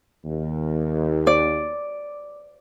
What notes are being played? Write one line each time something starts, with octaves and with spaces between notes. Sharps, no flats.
D#2
D5